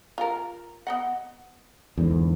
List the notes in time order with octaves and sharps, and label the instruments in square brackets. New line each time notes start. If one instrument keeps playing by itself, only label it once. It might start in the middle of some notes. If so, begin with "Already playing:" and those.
[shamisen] F4 A#4
B3 D#5 F#5
[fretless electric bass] E2 G#2 D3